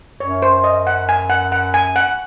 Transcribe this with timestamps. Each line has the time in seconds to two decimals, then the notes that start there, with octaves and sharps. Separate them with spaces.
0.20 F#2 C#5
0.42 C5
0.64 D#5
0.87 F#5
1.09 G#5
1.30 F#5
1.52 F#5
1.74 G#5
1.96 F#5